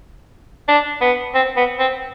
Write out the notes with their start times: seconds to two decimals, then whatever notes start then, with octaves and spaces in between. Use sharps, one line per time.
0.68 D4
1.01 B3
1.35 C4
1.57 B3
1.79 C4